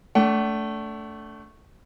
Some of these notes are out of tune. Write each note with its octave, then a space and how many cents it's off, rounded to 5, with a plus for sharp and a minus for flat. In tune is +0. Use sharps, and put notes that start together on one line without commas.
A3 +0 D4 -35 F#5 +40